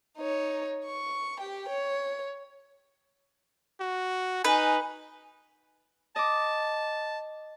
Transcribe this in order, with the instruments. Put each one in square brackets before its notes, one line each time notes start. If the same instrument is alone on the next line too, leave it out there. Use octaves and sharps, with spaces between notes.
[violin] D#4 C#5
C#6
G4 G5
C#5
[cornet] F#4
[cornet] D#4 [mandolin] B4 [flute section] G#5
[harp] D#5 D6 [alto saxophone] A5